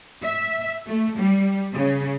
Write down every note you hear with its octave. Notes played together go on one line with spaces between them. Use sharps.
E5
A3
G3
C#3